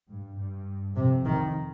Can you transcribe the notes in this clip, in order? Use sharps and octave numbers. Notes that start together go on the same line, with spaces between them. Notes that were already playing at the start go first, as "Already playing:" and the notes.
G2
G2
F2 C3
D#3